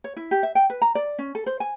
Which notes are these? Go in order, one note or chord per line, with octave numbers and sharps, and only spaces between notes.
C#5
E4
G4
E5
G5
B4
A#5
D5
C#4
A4
C5
G#5